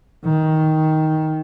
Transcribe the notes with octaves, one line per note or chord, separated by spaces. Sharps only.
D#3